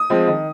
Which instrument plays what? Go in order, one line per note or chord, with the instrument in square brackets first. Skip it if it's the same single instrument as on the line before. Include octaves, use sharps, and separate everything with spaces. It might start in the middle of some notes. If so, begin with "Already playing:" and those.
Already playing: [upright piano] D#6
F3 G#3 C4
D#3